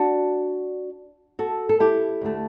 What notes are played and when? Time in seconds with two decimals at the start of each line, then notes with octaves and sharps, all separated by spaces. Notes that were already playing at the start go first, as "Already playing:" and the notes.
Already playing: D4 F#4
1.39 F#4 A4
1.69 A4
1.80 E4 G4
2.21 D2 D3 A3